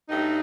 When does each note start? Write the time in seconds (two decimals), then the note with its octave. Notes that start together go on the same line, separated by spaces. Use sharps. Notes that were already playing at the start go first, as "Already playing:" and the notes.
0.09 G2 F#3 A3 D#4